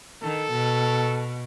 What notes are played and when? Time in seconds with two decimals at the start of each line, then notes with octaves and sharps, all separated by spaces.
0.22 D#3 A4
0.52 B2